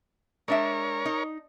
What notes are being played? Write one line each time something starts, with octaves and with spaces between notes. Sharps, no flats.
G#3 D4 A#4 C#5 E5
D#4